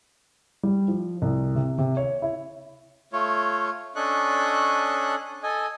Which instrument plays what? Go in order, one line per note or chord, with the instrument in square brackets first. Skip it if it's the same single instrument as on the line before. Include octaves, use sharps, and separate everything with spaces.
[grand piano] G3
F3
C2
C3
C3
C#5
E4
[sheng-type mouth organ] A3 F4 C#5
C#4 D4 A4 D#5 C#6 F#6
A4 D#5 G#5